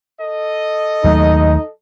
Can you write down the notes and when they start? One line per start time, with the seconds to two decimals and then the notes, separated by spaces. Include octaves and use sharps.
0.20 A4 D#5
1.04 D#2 F#3 A3 D#4